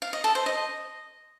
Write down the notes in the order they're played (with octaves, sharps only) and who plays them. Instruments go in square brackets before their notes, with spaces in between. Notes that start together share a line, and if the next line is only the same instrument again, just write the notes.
[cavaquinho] F5
D#5
A4
C5
D#5